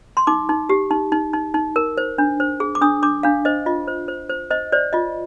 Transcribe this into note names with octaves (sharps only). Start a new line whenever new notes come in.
C6
D#4 D6
D#4
G4
D#4
D#4
D#4
D#4
A#4
C5
D4
C5
G#4
D6
D4 D#6
D4 D6
D4 F5
C5 D#5
F4 D#5
C5
C5
C5
C5 D#5
C5 D5
F4 D#5